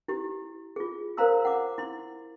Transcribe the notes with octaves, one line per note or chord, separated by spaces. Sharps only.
E4 G4
F4 G#4
A#4 C5 F5 A#5 C6 E6
F#5 D6
E4 C6